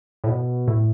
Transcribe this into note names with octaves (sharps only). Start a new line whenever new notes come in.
A2
B2
A2